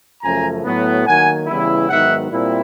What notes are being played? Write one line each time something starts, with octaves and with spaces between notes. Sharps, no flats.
F#2 C#3 F3 A3 G#5 A#5
A2 F#3 B3
D#3 F#3 A#3 F#5 G#5
C#3 E3 G3 B3 E4
G#2 D#3 F#3 B3 E5 F#5
A#2 G3 C4 E4